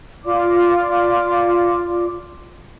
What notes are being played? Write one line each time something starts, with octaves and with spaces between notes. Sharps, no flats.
F4 D5 D6